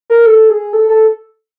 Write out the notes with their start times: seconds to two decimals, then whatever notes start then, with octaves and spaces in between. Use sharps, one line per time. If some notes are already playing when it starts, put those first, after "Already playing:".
0.10 A#4
0.26 A4
0.49 G#4
0.73 A4
0.89 A4